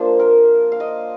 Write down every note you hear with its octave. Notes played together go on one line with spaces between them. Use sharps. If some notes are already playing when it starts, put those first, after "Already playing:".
Already playing: F3 A#3 D4 F4 C5
A#4
F5
D#5